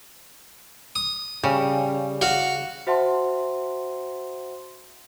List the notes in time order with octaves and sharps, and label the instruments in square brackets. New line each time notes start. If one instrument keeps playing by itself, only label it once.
[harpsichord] D#6
[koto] C#3 [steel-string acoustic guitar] G3
[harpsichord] F#4 F5 F#5
[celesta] F#4 C5 E5 F#5 A5 C6